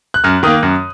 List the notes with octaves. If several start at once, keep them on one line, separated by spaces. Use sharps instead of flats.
F#6
F#2 F6
D#3 A#3 D#6
F#2